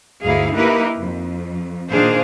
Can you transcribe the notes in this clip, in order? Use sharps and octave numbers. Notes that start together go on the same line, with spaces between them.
D2 G2 D#4 E4 G#4 F5
A#3 D#4 E4 G4 A#4 B4
F2
A#2 D#3 D4 G#4 C5 F5